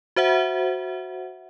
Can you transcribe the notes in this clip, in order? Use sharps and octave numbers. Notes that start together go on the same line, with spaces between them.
F#4 C5 E5 F#5